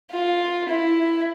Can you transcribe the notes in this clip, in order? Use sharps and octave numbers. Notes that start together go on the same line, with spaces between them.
F4
E4